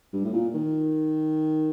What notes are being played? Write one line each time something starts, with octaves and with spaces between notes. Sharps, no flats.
G2
A2
A#2
D#3